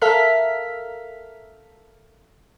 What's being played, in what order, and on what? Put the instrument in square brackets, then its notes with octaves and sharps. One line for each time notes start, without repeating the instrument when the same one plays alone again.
[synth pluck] A4 A#4 E5 F5 F6 B6